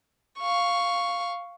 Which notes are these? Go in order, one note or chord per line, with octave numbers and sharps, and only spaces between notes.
F5 C#6